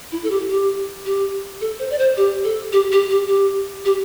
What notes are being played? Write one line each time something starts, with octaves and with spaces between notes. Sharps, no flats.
E4
A4
G4
G4
G4
A4
C5
D5
C5
G4
A4
G4
G4
G4
G4
G4